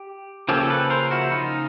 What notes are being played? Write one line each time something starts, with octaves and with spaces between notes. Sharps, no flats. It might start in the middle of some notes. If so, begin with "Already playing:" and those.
Already playing: G4
C#3 F3 A#3 C#4 G4 A4
A4 B4
A#4 C5
E4 F#4
D#4 F4